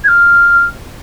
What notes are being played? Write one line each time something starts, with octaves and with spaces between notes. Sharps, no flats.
G#6
F6